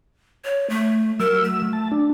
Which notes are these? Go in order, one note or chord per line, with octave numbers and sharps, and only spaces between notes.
C#5
A3
F#3 A#4 E6
A3
A5
D4